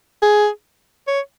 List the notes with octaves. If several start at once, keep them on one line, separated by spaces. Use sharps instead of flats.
G#4
C#5